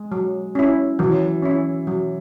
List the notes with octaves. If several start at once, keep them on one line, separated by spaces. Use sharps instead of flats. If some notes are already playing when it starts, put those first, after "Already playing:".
Already playing: G#3
F#3
C#4 E4
E3 F#3
C#4 E4
F#3